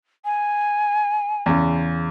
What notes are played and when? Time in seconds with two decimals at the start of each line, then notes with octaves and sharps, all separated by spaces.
0.25 G#5
1.46 E2 C#3